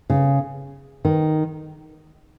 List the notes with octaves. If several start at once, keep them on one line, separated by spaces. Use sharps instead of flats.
C#3
D#3